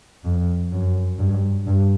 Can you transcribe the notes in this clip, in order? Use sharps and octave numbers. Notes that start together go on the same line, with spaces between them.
F2
F#2
G2
G2